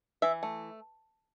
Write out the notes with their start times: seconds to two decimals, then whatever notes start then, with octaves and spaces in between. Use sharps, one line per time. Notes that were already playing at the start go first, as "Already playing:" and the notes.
0.22 E3 E5
0.43 A3